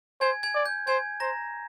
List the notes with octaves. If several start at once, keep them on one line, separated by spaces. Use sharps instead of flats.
C5 G#5 G#6
G#5 G#6
D5
G6
C5 G#5 G#6
C5 A#5 A#6